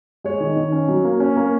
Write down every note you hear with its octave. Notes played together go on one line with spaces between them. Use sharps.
G#3 C#5
D#3
D#3
C#4
F#3
A#3
C#4
A#3